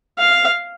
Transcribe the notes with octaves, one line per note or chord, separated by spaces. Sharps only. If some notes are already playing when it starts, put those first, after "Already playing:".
F5